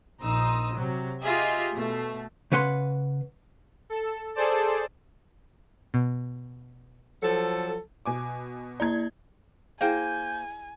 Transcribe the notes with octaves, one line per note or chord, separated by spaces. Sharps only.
A#1 D#4 A#5 C6 D#6 E6
C3 F#3
F4 G4 G#4 D#5 E5
B2 A3
C#3 B4 F#5 C6
A4
G#4 A4 C5 D5 A5
B2
F3 F#3 A4
B2 G#5 D6
A#3 E4 D5 A#5 G#6
A#3 E4 G#4 C5 F5 G5 G#5 G6